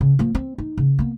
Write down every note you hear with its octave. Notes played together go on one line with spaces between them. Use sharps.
C#3
F3 A#3
C4
D#4
C#3
A#3 B3